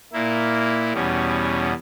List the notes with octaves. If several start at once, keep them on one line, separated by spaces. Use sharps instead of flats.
A#2 A#3 E4
E2 B2 G3 C#4